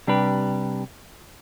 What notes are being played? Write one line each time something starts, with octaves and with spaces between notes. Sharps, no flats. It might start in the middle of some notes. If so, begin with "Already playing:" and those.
C3 G3 D4 G4 B4